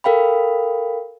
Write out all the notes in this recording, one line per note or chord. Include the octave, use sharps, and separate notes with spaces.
A4 A#4 F5 G5 B5